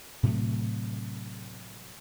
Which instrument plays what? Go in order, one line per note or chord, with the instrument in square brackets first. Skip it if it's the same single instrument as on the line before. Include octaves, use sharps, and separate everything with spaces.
[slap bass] A2 C3 F#3 A3